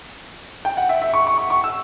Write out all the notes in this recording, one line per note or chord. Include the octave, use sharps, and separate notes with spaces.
G5
F#5
E5
E5
C#6
C#6
C#6
C#6
E6